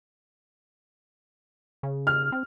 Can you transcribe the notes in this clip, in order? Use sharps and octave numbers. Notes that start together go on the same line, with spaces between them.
C#3
F6
C4